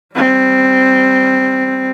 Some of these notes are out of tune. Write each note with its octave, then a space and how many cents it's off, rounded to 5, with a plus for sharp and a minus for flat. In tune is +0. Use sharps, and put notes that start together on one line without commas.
G3 +0 C4 +0